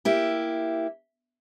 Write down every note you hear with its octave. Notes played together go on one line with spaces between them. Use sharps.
A#3 E4 G4